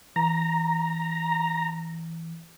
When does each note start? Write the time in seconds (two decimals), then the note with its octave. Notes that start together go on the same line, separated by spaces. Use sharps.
0.16 E3 A#5